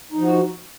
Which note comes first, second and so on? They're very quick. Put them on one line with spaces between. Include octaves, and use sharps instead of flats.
D#4 F3 F#4